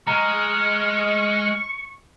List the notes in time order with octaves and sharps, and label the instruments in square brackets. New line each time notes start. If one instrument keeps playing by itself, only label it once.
[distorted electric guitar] G#3 [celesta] A#5 [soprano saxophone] C#6 [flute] F6